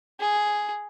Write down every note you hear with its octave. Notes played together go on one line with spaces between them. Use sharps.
G#4